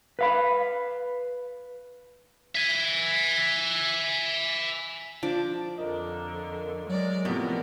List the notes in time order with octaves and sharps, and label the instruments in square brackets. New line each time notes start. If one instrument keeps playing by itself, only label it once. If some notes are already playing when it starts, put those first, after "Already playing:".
[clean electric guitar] B4 F5 B5
[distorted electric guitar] E5 G#5
[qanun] F3 D4 D6 [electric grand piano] A5
[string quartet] F2 D3 [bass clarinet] A#4 [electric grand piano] D#5
[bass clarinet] F#3 [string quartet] G#3 A#4 D5
[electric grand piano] A2 C3 F3 [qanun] B3 [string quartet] A#4